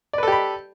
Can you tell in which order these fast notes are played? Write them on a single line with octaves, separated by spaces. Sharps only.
D5 B4 A4 G4 B5